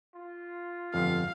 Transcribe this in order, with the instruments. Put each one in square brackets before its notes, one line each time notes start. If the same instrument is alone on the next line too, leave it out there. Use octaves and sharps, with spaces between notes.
[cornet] F4
[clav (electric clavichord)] G1 F2 [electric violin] F5